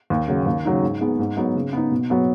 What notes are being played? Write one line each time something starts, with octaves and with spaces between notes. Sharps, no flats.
D#2
C#3 F#3
D#2
C#3 F#3 D#4
G#2
G#3 B3 D#4
G#2
F#3 B3 D#4
C#3
B3 D#4
B2
F#3 B3